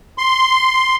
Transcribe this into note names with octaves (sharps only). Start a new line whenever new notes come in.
C6